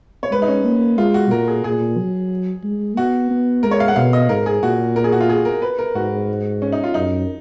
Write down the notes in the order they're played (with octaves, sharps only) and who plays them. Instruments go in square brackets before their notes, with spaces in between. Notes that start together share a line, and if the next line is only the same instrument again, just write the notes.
[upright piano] C#5
[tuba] G#3 [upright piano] B4
[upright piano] D#4
C#4
[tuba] A#3
[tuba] G#3 [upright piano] F4
[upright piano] F#4
[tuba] A#2 [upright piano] A#4
[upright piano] G#4
[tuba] A#2 [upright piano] G#4
[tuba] F#3
G#3
[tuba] B3 [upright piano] F#4
[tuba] B3
[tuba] G#3 [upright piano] A#4
[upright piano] C#5
F5
F#5
[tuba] B2 [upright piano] F5
[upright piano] D#5
[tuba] G#2 [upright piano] A#4
[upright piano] G#4
[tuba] A#2 [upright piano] F#4
[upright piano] A#4
G#4
F#4
F4
G#4
A#4
B4
A#4
[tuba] G#2 [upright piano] F#4
[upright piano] C#4
D#4
F4
[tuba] F#2 [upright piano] D#4